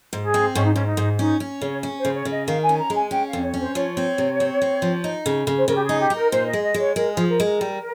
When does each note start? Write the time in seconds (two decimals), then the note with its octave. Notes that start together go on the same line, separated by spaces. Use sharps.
0.13 G#2
0.23 G#4
0.34 C4
0.55 G#2 C#4
0.64 D#4
0.74 G#2 C#4
0.87 D#4
0.97 G#2
1.19 C#4 D#4
1.40 C#4
1.61 C#3 C#5
1.83 C#4
1.99 C5
2.05 C#3
2.15 C#5
2.25 C#3
2.31 D#5
2.47 D#3 F5
2.63 G#5
2.69 C#4
2.79 A#5
2.90 G#3
2.96 G#5
3.11 C#4 G5
3.27 F5
3.33 F2
3.44 C#5
3.54 C#4
3.60 C5
3.75 F3 C#5
3.97 C4
4.18 C3
4.40 C4
4.62 C4
4.82 F3
5.04 D#4
5.26 C#3
5.47 C#3
5.58 C5
5.68 C#3 A#4
5.76 G4
5.84 G#4
5.89 D#4
6.00 G4
6.10 D#4
6.16 A#4
6.32 A#2 C5
6.48 D#5
6.53 G#3
6.65 D#5
6.74 G#3
6.80 C#5
6.96 G#3 A#4
7.13 F3 G#4
7.29 A#4
7.40 G#3
7.45 A#4
7.61 G3